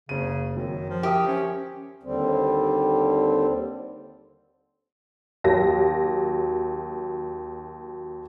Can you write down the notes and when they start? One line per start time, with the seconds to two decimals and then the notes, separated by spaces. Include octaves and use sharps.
0.09 F#1 C#3 D#7
0.56 F#2 D#3
0.90 F3
1.03 G4 A#4 E5 D#6
1.28 C#4
2.03 D#2 D3 G3 C4
5.44 D#2 F#3 A#6